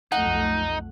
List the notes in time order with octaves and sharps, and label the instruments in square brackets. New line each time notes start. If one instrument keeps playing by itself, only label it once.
[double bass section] B1 F2 A3 [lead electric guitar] D#4 [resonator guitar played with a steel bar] F#5